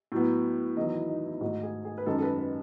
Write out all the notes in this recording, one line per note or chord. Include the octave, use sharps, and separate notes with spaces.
A2 F#3 B3
E2 D#3 F#3 B3 D#5
E4
D#4
E4
G#2 D#3 A3 F#4
G#4
G#4
B4
F#2 D#3 G#3 A4
A4
B4
B4